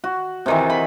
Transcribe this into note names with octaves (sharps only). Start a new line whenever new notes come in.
F#4
C3 D#3 E3
B5